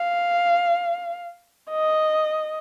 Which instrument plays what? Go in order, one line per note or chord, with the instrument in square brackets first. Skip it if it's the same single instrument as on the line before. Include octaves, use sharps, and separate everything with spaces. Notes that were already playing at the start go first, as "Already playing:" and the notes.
Already playing: [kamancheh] F5
D#5